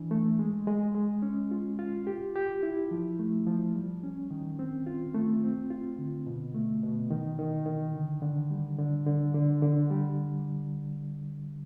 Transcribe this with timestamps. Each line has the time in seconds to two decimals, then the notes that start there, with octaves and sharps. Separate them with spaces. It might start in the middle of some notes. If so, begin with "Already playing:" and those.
Already playing: E3 D4
0.11 A3
0.39 G#3
0.67 G#3
0.95 G#3
1.22 C#4
1.51 F4
1.79 F4
2.07 G4
2.36 G4
2.63 E4
2.91 F3
3.19 A3
3.47 F3
3.75 G3
4.03 C#4
4.31 D#3
4.59 C4
4.87 F4
5.15 A3
5.43 C4
5.70 F4
5.98 D3
6.27 B2
6.55 A3
6.83 B2
7.11 D#3
7.39 D#3
7.66 D#3
7.94 D3
8.22 D3
8.51 G3
8.78 D3
9.07 D3
9.34 D3
9.62 D3
9.90 G3